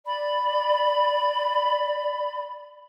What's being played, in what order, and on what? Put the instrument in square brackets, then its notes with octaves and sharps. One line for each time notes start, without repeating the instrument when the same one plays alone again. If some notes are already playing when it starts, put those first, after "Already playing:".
[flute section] D5 B5